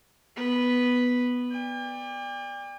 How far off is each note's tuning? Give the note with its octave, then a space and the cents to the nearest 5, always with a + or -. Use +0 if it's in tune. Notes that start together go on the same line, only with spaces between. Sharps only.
B3 +0 B4 +0
D5 +0 G5 +45